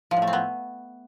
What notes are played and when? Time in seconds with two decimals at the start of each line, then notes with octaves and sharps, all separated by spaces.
0.11 F3
0.17 A2
0.22 A3
0.27 C4
0.33 B3